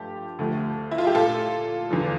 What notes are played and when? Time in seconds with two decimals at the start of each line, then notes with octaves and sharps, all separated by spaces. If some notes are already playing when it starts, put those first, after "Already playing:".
Already playing: G2 F3 A3 G4
0.39 D2 D3 F3 A3
0.91 E4
0.98 F4
1.07 G4
1.15 A#2 A3 F4 A4
1.91 E2 D3 F3